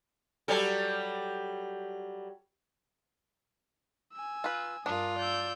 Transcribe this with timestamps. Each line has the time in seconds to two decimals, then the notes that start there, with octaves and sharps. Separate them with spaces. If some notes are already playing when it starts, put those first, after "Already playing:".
0.48 F#3 G3 A4
4.13 G#5 E6
4.44 F4 B4
4.86 G2 D4 F4 A#4 D#6
5.19 D5 E6 G6